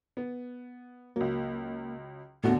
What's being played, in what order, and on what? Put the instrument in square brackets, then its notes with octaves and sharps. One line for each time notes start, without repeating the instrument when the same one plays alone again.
[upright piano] B3
[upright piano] C#2 F#3 [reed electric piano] A#3
[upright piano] D#2 D3 F#3 [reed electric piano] A2 A3 F#4 [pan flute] B3